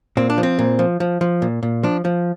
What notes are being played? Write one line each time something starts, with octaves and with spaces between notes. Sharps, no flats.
A#2 C4
D4
F3
C4
A#2
F3
F3
F3
A#2
A#2
F3 D4
F3